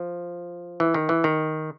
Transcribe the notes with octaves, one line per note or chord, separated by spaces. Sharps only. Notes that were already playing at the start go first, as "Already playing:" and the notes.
Already playing: F3
E3
D#3
E3
D#3